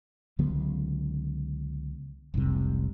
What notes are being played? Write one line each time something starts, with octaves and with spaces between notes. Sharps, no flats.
C#2 D3 F#3 B3
F1 C2 G#2 C3